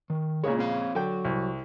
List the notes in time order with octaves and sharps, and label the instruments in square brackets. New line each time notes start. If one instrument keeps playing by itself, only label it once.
[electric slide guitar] D#3
[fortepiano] A#2 C#3 G#3 [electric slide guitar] C#5
[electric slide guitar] C4 C#5 F5
[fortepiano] D3 G5 [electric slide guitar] F#3
[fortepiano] C2